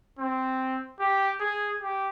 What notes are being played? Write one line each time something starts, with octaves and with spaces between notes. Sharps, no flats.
C4
G4
G#4
G4